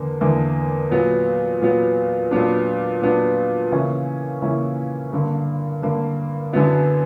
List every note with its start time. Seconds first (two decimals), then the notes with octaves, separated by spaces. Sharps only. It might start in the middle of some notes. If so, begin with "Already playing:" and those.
Already playing: E2 D3 A#3
0.21 E2 D3 A#3 E4
0.91 A#2 F#3 B3
1.62 A#2 F#3 B3
2.31 A#2 F#3 B3 D4
3.02 A#2 F#3 B3 D4
3.72 C#3 E3 A#3 C#4 E4
4.42 C#3 E3 A#3 C#4 E4
5.12 G2 D3 A#3
5.82 G2 D3 A#3
6.53 F#2 D3 F#3 B3 E4